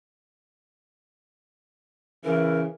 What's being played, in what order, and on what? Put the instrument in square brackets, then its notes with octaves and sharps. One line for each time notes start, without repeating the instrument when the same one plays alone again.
[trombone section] C#3 E3 [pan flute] A#4